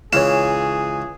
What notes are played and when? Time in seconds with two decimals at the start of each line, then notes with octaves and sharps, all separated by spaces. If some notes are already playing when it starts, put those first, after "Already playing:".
0.13 C#2 E3 C#4 G#4 C#5 F5 E7